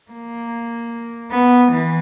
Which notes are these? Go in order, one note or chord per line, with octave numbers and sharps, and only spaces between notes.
A#3
B3
E3